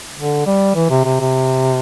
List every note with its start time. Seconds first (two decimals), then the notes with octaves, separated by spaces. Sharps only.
0.17 D3
0.46 G3
0.75 E3
0.90 C3
1.05 C3
1.20 C3